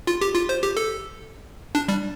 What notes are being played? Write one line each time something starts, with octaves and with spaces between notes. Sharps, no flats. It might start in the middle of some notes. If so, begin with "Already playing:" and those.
F4
G4
F4
C5
G4
A4
D4
G3